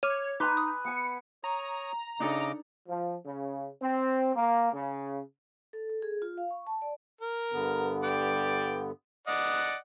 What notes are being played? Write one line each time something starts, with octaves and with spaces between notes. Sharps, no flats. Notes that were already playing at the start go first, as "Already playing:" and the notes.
C#5 D6 F6 D#7
D#4 B4 G#5 A#5 C6 D6
D#6
B3 G#5 C#7
C#5 A#5 D#6
C#3 D4 D#4 A4 D#5 D6
F3
C#3
C4
A#3
C#3
A4
A4
G#4
F4
F5
C#6
A5
D5
A#4
G2 D3 B3
D5 G5
D5 D#5 F#5